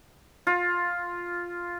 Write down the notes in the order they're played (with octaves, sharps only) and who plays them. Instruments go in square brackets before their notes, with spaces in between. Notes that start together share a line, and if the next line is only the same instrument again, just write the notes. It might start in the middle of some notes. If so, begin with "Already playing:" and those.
[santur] F4